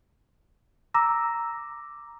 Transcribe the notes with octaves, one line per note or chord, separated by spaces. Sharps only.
A#5 D6 E6 A#6